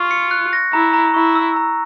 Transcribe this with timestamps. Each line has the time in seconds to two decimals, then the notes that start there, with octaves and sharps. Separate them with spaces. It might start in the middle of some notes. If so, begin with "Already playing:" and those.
Already playing: F4 C#6
0.11 C#7
0.31 F#6
0.53 A#6
0.73 E4 A#5
0.93 A#5
1.14 E4 C#6
1.35 E6
1.56 A#5